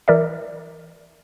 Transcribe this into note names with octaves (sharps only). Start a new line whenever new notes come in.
E3 A#4 D5 E5